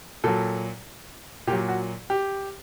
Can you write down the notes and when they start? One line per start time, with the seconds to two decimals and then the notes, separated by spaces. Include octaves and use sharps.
0.24 A#2 F#3 A4
1.47 A#2 G4
1.52 F#3
1.68 F#4
2.10 G4